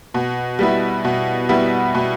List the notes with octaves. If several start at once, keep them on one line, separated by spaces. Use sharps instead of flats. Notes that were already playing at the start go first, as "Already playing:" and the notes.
B2
G3 B3 E4
B2
G3 B3 E4
B2